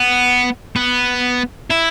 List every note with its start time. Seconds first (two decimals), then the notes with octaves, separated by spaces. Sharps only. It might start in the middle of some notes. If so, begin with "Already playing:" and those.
Already playing: B3
0.76 B3
1.71 E4